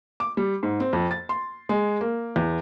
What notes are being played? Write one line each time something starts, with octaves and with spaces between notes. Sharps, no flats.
D6
G3
G#2
C4
F2
A6
C6
G#3
A#3
E2